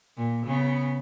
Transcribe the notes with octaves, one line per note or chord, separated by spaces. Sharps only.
A#2
C#3 B3